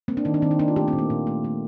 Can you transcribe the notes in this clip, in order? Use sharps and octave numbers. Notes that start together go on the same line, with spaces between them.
A#3 C4
D4
D#3 D#4
D4
D#3 C4
D#4
A#3 D4
F4
A3 G4
C4
A#2
A#3
A#2
A3
A3